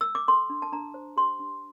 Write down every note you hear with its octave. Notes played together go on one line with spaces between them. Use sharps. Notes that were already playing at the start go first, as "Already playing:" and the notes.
E6
D6
A4 C6
D4
A5
D4 A#5
C5
G4 C6
D4